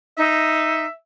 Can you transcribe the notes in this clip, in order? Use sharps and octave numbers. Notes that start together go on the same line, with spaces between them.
D#4 E5